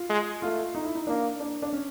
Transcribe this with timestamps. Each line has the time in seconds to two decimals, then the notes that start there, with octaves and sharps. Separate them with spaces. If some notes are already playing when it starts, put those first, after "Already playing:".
Already playing: F4
0.09 G#3
0.42 A3 F4
0.75 D#4
0.85 E4
0.95 D#4
1.07 A#3 D4
1.40 D4
1.62 D4
1.73 C#4